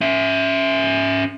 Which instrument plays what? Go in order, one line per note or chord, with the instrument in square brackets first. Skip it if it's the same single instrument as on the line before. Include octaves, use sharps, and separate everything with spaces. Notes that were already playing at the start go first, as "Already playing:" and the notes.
[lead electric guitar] C#4 E5